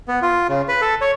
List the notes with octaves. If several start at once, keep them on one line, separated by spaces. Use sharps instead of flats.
B3
F4
C#3
B4
A4
C#5